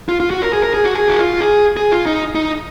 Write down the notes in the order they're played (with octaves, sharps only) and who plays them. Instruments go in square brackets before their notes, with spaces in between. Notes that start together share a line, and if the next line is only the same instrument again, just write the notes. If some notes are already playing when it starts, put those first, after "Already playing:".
[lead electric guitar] F4
F4
F#4
A#4
G#4
A#4
G#4
F#4
G#4
F#4
F4
G#4
G#4
F4
D#4
D#4